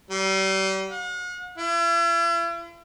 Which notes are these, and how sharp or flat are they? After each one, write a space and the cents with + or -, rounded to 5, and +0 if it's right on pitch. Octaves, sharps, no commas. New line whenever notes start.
G3 -35
F#5 -45
E4 +45